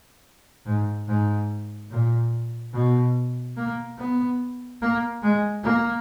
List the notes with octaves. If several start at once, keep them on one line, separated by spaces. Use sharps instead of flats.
G#2
G#2
A#2
B2
A#3
B3
A#3
G#3
A#3